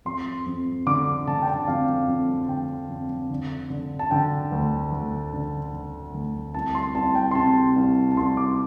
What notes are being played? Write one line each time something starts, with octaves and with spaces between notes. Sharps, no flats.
F2 C6
F2
D3 D6
D3 A5
G5
A5
F2 F5
F2
D3 G5
F2
D3
D3
A5
D3 G5
D2
D2
D3
D3
D2
C2 A5
C6
C2 A5
G5
C6
C3 A5
C2
A5
C2 C6
D6